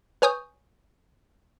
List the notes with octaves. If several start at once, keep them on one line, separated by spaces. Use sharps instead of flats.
B4 C#5 G#5 C#6 D#6 G6